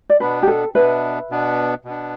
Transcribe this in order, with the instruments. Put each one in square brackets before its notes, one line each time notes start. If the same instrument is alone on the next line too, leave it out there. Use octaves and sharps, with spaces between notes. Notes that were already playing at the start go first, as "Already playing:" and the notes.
[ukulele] D5
[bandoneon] B2 B3 D4 [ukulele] B4
[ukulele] G4
A4
[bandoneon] B2 B3 D4 [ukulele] B4 E5
[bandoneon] B2 B3 D4
B2 B3 D4